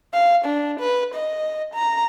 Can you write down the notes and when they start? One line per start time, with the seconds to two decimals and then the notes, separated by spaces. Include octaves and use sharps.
0.13 F5
0.45 D4
0.80 B4
1.15 D#5
1.74 A#5